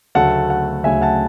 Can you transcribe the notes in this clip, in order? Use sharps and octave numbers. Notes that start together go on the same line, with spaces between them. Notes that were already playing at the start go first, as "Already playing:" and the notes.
D2 C#3 F#3 A3 F#5 A5
F#5
D2 C#3 F#3 A3 E5 G#5
F#5 A5